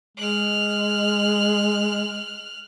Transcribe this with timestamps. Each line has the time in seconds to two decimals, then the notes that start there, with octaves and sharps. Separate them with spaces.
0.17 G#3 F6 F#6